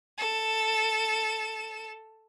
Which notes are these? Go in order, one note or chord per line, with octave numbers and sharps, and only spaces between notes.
A4 E7